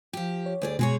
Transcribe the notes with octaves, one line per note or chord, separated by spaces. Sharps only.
F3 G4
C#5
D2 G#4 D5
B2 G#3 G#4 C#5